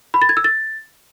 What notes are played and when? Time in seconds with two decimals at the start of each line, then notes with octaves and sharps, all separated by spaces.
0.14 B5
0.22 A6
0.29 G#6
0.37 E6
0.44 A6